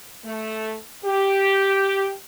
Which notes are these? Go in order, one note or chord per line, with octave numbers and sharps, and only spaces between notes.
A3
G4